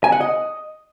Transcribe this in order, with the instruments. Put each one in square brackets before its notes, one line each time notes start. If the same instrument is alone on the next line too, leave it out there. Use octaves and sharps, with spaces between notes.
[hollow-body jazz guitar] G#5
F#5
D#5